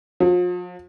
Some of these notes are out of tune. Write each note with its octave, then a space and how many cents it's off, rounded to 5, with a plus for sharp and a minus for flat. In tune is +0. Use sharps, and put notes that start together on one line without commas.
F3 +40